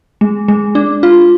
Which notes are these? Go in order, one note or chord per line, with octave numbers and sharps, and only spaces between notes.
G#3
G#3
D4
F4